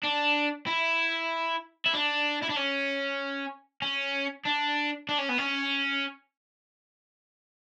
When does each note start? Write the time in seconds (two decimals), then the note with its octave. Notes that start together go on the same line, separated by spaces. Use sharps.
0.03 D4
0.67 E4
1.86 E4
1.93 D4
2.42 E4
2.49 D4
2.56 C#4
3.82 C#4
4.45 D4
5.09 D4
5.19 C#4
5.29 B3
5.38 C#4